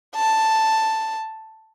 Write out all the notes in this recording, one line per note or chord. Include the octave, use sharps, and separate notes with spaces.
A5